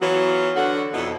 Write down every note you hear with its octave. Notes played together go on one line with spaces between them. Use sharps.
E3 F#3 B3 F4 F#4 C#5
D3 F#4 F#5
F2 B2 B3 D#4 E4